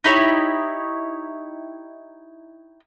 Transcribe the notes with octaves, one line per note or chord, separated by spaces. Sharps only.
D#4 E4 G4 C#5